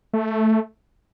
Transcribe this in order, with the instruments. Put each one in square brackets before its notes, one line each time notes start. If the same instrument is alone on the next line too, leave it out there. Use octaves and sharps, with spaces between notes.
[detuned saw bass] A3